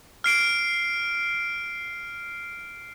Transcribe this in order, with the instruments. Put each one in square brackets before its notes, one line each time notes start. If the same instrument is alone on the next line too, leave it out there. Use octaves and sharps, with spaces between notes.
[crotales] F6 C7 D7